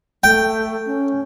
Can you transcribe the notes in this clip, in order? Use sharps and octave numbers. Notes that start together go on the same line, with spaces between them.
A3 G5
C#4